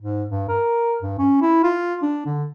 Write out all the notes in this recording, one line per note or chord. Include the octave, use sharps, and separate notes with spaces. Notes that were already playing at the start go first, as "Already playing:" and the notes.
G#2
G2
A#4
G2
C#4
E4
F4
D4
D3